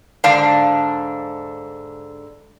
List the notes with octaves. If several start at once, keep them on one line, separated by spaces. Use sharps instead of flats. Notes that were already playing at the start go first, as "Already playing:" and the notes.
G#2 D3 D4 F5